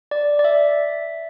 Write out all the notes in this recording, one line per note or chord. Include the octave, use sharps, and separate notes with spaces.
D5
D5
E5